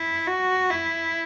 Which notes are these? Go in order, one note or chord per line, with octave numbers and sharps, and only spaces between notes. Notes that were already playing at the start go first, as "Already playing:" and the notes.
Already playing: E4
F#4
E4